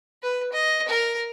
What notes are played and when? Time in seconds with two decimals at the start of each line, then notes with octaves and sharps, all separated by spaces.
0.23 B4
0.52 D#5
0.88 A#4